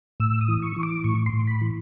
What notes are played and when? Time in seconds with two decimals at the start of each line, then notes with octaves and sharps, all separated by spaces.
0.20 A2 E6
0.41 D#6
0.48 E3
0.62 C#6
0.76 E3
0.83 D6
1.04 A2 C#6
1.26 C6
1.33 A2
1.47 B5
1.61 E3